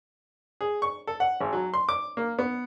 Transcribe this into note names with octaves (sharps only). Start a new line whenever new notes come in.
G#4
C#6
A4
F#5
G#1
F#3
C6
D6
A#3
B3